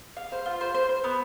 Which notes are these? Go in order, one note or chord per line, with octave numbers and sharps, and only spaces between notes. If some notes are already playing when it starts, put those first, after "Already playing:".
F5
C5
F4
C5
C5
C5
B3